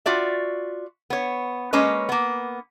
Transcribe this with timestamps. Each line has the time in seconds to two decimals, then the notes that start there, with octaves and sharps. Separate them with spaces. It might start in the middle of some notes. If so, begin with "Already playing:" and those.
0.06 F4 F#4 D5 E5
1.10 B3 C#5
1.73 G#3 A#3 C#4 B4 C#5 D#5
2.09 A#3 B3